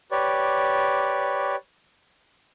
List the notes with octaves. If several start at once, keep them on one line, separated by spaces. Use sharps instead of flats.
G4 B4 C#5 D5